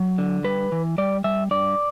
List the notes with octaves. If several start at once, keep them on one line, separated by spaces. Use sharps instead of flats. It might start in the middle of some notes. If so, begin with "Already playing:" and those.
Already playing: F#3
D3
G3 B4
E3
G3 D5
G3 E5
G2 D5